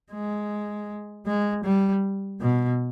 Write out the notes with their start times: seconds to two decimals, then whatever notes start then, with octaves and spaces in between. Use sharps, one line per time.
0.11 G#3
1.26 G#3
1.64 G3
2.41 B2